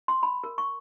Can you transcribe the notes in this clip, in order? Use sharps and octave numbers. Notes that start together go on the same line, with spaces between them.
C6
B5
A#4
C#6